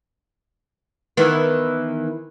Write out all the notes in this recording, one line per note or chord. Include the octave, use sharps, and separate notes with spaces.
D#3 E3 B3